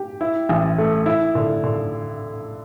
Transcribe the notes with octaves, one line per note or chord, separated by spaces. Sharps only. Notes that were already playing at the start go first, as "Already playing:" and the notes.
Already playing: G4
E4
A1
A3
E4
D3
D3